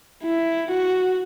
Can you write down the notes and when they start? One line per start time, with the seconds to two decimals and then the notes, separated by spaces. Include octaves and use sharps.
0.23 E4
0.70 F#4